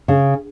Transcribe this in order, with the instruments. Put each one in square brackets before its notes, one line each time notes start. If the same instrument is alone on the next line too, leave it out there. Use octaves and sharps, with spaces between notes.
[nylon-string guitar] C#3